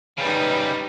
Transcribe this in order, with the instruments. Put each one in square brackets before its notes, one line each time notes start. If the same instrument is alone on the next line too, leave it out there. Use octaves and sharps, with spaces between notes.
[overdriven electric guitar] C#3 G3 [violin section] D#4 B4